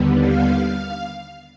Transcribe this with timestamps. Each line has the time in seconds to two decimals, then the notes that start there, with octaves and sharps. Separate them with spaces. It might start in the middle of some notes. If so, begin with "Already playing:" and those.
Already playing: D#2 D3 G3 B3
0.19 F5